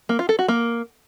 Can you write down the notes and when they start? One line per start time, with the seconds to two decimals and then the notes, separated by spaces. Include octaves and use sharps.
0.09 A#3
0.19 F4
0.29 A4
0.39 F#4
0.48 A#3